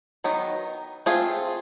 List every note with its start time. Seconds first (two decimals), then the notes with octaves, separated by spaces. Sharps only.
0.24 D#3 F#3 B3 D#4
1.06 A3 C4 F4 G#4